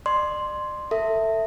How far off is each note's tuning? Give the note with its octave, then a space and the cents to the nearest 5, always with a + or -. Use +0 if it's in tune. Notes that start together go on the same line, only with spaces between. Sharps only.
D5 +35 C6 +0
A4 +25 E5 +0